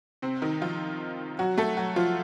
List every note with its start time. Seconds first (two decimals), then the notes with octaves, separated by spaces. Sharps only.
0.22 C3 C4
0.42 D#3 D#4
0.62 F3 F4
1.39 F#3 F#4
1.58 A3 A4
1.77 F#3 F#4
1.96 F3 F4